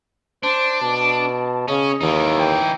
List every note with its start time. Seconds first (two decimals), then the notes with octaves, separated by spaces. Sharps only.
0.43 D4 C5
0.82 B2 A5
1.68 C#3 C#4 D#5
2.01 D#2 E3 D#4
2.39 G5